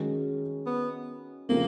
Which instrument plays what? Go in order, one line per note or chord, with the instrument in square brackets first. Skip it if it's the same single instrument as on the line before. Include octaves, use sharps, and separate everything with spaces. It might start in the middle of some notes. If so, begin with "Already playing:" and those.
Already playing: [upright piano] D#3 G#3 C#4 F#4
[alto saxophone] B3
[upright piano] C#3 F3 A3 C4 [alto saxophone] A#3